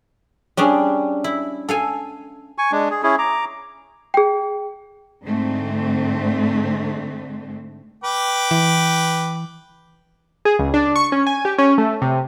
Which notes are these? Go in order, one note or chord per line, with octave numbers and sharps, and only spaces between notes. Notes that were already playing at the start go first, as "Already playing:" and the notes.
G3 C#4 D4 G#4
E4
A4 F5 G#5
G#5 C#6
G#3 D4
G#4
C#4 E4 G#4
A#5 D6
G#4 G5
G#2 D3 A3 C4
B4 G5 D6
E3
G#4
C#2
D4
C#6
C#4
G#5
G4
C#4
A3
C3